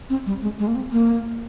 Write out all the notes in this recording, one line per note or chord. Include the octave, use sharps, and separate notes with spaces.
C4
G3
G#3
G#3
A#3
C4
A#3